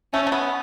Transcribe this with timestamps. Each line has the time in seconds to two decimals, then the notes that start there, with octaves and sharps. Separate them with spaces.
0.13 A3 C#4
0.27 A3
0.32 B3